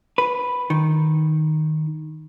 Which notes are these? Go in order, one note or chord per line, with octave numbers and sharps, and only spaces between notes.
B4
D#3